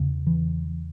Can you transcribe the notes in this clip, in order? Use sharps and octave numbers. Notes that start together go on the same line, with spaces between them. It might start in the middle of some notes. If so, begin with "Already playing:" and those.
Already playing: E2 C#3
E3